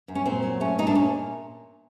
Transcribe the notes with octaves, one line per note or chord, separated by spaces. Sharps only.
F#2
C#4
A#2 C4
F#3
A3 C#4
A#2 D#4
D4
A#2 C#4